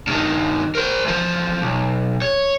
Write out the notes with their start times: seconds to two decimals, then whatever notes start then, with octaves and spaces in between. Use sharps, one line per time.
0.07 G2 D#3
0.75 A#4 C5
1.05 E2 F3
1.62 B1
2.22 C#5